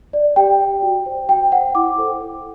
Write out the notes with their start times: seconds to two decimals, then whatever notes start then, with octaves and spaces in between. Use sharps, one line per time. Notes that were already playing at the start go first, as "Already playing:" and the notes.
0.13 D5
0.36 G4 G5
0.59 D5
0.82 F#4
1.06 C5
1.28 F#4 G5
1.52 C5 F#5
1.75 E4 D6
1.98 A4 C5
2.21 E4